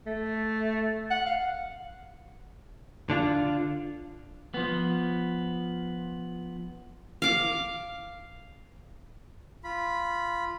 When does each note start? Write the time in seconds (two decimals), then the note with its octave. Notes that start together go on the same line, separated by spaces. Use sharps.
0.06 A3
1.11 F#5
1.26 F5
3.10 D3 D4 F4
4.54 F3 B3
7.22 F5 D6
9.64 F4 B5